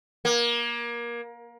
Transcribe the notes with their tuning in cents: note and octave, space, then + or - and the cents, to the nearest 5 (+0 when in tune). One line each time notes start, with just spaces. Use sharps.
A#3 +25